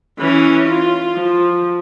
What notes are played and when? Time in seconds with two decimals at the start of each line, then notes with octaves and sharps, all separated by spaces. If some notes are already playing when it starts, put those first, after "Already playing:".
0.19 E3 C#4
0.68 F4
1.14 F3